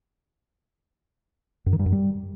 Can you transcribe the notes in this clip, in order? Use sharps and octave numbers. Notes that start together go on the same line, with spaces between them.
F#2
D#3
G2
F#2
G3